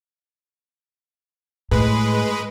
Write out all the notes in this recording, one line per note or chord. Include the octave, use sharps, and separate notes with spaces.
A2 G#3 B4